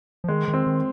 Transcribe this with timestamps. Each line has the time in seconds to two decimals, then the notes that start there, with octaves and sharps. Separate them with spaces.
0.24 F3
0.28 D#3 G#3
0.48 D#3
0.54 C4
0.67 D#3